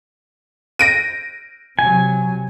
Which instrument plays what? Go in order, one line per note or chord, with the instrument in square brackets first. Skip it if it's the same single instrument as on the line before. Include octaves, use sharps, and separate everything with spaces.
[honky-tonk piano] A#6 D7 D#7
[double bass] C3 F#3 [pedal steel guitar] G#5